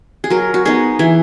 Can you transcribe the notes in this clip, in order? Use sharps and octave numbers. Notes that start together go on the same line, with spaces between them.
G#4
F#3 A#4
F#4
B3 D#4 G#4
E3 G#4